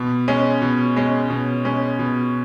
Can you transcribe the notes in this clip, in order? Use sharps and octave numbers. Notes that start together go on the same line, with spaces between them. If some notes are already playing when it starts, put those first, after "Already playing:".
Already playing: B2
G#3 C#4
B2
G#3 C#4
B2
G#3 C#4
B2